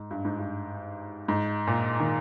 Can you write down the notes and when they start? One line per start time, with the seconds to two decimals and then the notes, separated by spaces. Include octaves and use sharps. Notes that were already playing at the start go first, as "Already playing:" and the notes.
Already playing: G#2
0.11 G2
0.25 G#2
0.38 G2
1.28 G#2
1.67 A#2
2.00 D#3